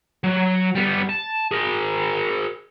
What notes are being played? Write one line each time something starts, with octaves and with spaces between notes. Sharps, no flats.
F#3
G3 B3
A5
G#4 A#4